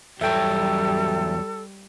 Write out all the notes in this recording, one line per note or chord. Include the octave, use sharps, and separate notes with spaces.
E2 F#3 G3 A4 E5 G5